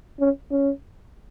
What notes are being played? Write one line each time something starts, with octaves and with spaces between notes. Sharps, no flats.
C#4
C#4